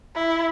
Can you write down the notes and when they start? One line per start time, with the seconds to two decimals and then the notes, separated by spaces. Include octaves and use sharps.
0.15 E4